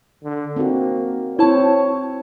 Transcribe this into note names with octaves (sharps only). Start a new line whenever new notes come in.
D3
A#3 C4 D#4 F#4
C4 E4 C5 C#5 A5